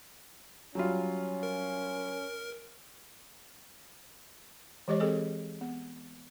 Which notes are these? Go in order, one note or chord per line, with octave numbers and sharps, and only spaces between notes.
F#3 G3 C#4 F4
A#4
E3 G#3 G4 C#5 D#5
C4 G#4 A4 D#5
B3